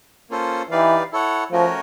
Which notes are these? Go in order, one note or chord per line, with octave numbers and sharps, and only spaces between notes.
A#3 C#4 F4 A4 C5
E3 D#4 G4 B4 D5 F5
E4 A4 C#5 F#5
F3 A3 C#4 F#4 A#4 C#5